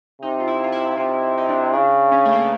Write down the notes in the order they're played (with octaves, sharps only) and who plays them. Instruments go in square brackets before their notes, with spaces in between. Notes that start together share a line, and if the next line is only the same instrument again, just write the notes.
[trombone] C3 [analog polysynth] D#4
[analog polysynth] F4
E4
F4
E4
[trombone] C3 [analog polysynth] F4
[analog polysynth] D#4
D4
[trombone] C#3 [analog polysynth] D4
[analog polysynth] C#4
A3
A#3
B3